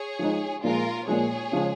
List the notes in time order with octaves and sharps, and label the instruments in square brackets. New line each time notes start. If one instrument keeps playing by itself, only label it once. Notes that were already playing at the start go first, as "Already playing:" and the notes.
Already playing: [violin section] G#4 C#5
[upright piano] F3 G#3 D#4
[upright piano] A#2 F3 G#3 [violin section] F4 A#4
[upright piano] A#2 F3 G#3 [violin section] G#4 C#5
[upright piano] C#3 F3 G#3